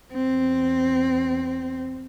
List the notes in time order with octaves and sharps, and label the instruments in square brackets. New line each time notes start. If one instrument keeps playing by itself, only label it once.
[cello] E2 C4